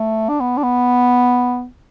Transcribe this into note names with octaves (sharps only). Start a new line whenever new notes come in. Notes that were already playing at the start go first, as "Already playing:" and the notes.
Already playing: A3
D4
B3
D4
B3